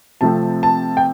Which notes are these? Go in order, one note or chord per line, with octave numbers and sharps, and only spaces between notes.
C3 F3 A3 C4 A5
A5
G5